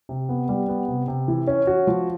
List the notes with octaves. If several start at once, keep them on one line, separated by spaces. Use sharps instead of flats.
C3
B3
G3
B3
C3
C3
E3
C#4
F#4
F3